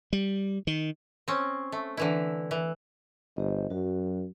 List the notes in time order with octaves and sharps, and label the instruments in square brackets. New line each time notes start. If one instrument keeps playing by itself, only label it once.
[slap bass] G3
D#3
[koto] C4 C#4
A3
D3 E3 E4
E3
[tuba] G1 [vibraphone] G4 C5 D#5
[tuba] F#2 [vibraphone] F#3 F#4